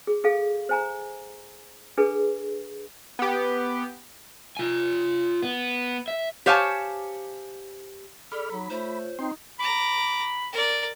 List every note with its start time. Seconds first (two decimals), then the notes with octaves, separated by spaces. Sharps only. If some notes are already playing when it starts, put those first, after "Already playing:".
0.07 G#4
0.24 G#4 A4 F5
0.69 C5 G#5 A#5
1.98 D4 G#4 A4 B4
3.19 B3 G4
4.57 F4 G#5
5.42 B3
6.08 E5
6.46 G4 C5 C#5 F5 G#5 A5
8.32 G#4 A4 D5 B5 F6
8.50 F#3 D#4 A#5 B5
8.70 A3 F4 C5 C#5
9.19 C4 D#4 G5 C6
9.59 A#5 B5 D6
10.53 A#4 D5